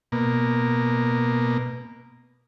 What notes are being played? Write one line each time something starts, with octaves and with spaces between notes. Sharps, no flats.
B2 A#3